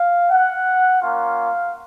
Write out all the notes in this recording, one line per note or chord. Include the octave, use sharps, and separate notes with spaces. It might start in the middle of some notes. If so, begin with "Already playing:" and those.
Already playing: F5
F#5
A#3 C#4 F4 F5